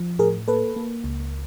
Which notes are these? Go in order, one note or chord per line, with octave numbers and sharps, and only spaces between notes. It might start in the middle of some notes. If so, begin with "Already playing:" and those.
Already playing: F3
A2 G#4 A#4
A#3 A4 B4
A#3
C#2